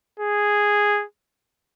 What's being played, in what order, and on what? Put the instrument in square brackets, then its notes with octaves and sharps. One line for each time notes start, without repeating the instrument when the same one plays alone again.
[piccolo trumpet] G#4